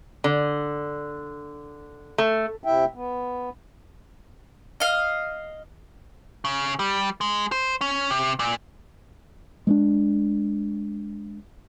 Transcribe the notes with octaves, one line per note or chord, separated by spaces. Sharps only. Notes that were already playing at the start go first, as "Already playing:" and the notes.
D3
A3
C3 E4 E5 G5
B3
D#5 F5
C#3
G3
G#3
C5
C#4
C3
A#2
G#3 A#3 D4